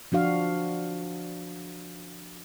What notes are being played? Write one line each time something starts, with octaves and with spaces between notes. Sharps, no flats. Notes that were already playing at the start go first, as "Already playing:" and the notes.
F3 D4 F#4 F5